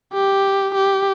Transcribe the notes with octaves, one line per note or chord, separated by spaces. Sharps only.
G4
G4